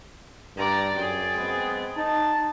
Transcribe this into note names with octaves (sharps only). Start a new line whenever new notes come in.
G2 D5 A#5 A6
F#2 G#4 G5
G#3 B3 C4
D#4 A5 A6